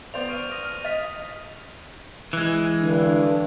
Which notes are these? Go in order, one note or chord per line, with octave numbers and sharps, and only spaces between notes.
B3 C5 D5 F7
C#6 F6 D7 D#7
D#6 A#6 D#7
F6
D#5 A6 B6
E3 G#3
G2 D3